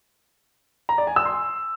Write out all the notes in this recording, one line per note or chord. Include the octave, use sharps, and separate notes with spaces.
A#5
D5
G#5
E6
C6